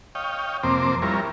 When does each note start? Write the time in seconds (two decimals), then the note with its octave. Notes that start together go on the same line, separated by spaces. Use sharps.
0.15 C#5 D#5 F5 G5
0.63 F2 C3 A#3 C4 C5 D6
1.02 G3 E4 F4 A#4 C#5